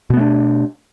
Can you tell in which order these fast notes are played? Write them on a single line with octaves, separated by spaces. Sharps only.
B2 B3 A3 D4